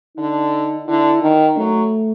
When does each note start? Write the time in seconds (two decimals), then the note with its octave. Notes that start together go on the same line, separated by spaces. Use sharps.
0.17 D3 D#4
0.88 D3 E4
1.22 D#3 D#4
1.57 F#3 A3